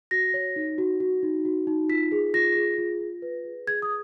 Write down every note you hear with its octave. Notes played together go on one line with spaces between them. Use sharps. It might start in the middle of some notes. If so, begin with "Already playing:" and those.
F#4 A#6
C#5
D#4
F#4
F#4
D#4
F#4
D#4
F4 B6
G#4
F4 A#6
G#4
F4
F4
B4
G#4
G#4 G#6
D#6